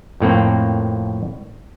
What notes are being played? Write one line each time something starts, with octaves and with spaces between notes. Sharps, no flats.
F2 A2 A#3 C4